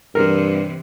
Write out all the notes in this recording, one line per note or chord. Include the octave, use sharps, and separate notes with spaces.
G2 C3 E3 A#4